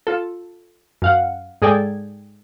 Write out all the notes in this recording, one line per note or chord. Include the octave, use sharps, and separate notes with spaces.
F4 A4
F#2 F5 F#5
G#2 G#4 A4 D5 G5 G#6